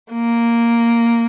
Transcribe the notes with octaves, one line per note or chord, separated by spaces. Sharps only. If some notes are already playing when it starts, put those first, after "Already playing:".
A#3